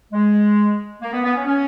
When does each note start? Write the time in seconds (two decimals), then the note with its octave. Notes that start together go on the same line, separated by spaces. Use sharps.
0.13 G#3
1.02 A#3
1.13 B3
1.24 B3
1.35 C#4
1.46 C#4